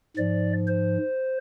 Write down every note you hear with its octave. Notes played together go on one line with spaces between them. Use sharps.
G#2 F3 D5
C5